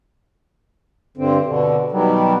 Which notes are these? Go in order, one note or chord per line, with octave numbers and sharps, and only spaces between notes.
G2 D3 C4
B2 D3
B2 D#3 F#3 G3